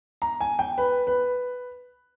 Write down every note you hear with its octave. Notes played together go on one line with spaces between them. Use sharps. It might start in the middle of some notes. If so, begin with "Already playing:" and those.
A#5
G#5
G5
B4
B4